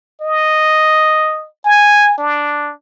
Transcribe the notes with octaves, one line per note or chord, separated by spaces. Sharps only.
D#5
G#5
D4